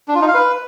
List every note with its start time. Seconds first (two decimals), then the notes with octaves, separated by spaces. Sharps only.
0.08 D4
0.15 F4
0.21 D#4
0.28 F5
0.34 B4